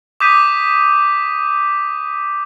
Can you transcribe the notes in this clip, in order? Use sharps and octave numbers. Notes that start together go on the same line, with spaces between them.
D6 D#6 G6 B6 D#7